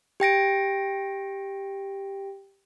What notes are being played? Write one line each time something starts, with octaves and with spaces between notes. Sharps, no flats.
G4 G5 A#6 D7